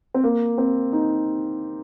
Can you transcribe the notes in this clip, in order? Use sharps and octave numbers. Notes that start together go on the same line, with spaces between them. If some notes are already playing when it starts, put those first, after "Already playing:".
C4
A#3
C4
D#4